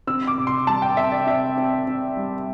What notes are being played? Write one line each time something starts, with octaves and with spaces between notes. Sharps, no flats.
C4 E6
D6
C3
C6
G3 A5
G5
C3 E5
D5
C4 E5
C4
C4
G3